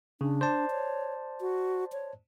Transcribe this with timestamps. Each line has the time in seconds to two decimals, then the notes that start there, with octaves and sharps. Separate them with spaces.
0.21 C#3 D4
0.41 C5 D5 A5
0.70 C#5
1.41 F#4
1.92 C#5